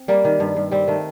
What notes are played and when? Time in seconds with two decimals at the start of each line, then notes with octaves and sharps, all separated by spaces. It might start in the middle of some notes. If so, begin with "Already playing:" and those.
Already playing: C4
0.08 G3 A#3
0.25 D#3
0.40 G2
0.56 G2
0.71 G3 C4
0.88 D#3 A3